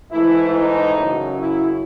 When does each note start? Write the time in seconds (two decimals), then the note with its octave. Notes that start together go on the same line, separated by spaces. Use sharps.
0.11 G#2 E3 A3 E4
0.52 D#4
0.94 F#2 C#3 F#3
1.36 E4